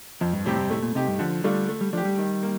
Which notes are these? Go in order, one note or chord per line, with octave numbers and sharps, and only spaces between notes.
F2 F3
G2
A2 C3 G3 C4 G4
G2
A2 A3
A#2
C3 D#4 G4
G2
D3 F3
G3 A3 D4 F4
A3
G3
F3 D4 G4
G3
D#3
A#3